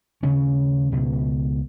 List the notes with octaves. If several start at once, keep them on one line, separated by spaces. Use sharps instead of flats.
D#2 C#3 C#4
C#2 B2